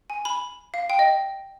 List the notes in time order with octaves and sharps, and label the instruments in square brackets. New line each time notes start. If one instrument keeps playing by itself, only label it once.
[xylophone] G#5
B5
F5
G5
D#5